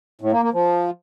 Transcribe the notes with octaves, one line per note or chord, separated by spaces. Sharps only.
A2
A#3
A#3
F3